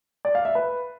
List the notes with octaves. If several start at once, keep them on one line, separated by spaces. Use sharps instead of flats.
D5
F5
E5
B4